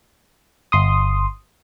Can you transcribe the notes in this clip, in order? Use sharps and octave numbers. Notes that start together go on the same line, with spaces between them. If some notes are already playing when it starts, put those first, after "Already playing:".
G1 C6 D#6